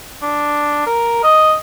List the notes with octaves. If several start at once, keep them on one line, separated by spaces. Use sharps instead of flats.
D4
A#4
D#5